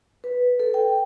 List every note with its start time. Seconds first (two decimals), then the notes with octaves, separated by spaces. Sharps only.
0.24 B4
0.60 A4
0.74 G5